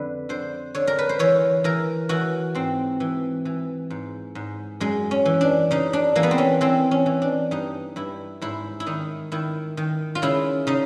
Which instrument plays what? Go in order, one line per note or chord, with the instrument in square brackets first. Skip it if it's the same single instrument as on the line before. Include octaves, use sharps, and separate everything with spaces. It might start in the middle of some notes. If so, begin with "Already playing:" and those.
Already playing: [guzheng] F2 D3 B4
D3 C5
D3 C#5
A#4
B4
C5
E3 C#5
E3 A#4
E3 F#4
G#2 C4
E3
E3
G#2
G#2
F#2 G#3
C#4
E3
D4
C#3 D#4
D4
E3 A#3
B3
C4
C#4
E3 C4
C#4
E3
D4
G2 D#4
G2 E4
G#2 E4
E4
D#3 D#4
D#3 E4
D#3
F4
C#3 E4
C#3 D#4